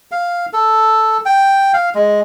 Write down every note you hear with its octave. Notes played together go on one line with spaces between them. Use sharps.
F5
A4
G5
F5
G#3